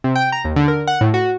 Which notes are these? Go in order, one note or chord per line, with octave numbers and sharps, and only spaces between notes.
C3
G5
A#5
D#2
D3
A#4
F#5
A2
F#4